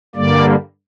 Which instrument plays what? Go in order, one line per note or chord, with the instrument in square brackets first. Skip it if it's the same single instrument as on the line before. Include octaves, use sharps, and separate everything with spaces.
[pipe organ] G2 D3 G3 A#3 D5